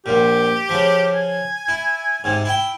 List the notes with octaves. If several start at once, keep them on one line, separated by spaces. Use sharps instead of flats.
A#1 A#2 G4
C#3 F3
G#5
E4
G#2 C3
E4 G5